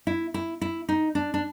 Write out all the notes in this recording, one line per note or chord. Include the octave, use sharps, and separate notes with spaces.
E4
E4
E4
D#4
D4
D4